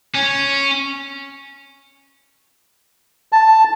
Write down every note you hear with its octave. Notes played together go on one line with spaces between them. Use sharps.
C#4
A5